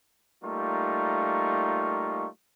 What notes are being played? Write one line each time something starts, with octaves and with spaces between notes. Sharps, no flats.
G3 A3 A#3 D#4 F4 C#6